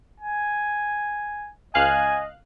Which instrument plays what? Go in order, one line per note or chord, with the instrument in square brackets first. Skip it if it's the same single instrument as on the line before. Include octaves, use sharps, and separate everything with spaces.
[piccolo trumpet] G#5
[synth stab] C#2 F5 F#6 [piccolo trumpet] D#5 [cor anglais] G#5